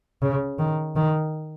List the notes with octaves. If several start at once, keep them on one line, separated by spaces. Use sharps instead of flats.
C#3
D#3
D#3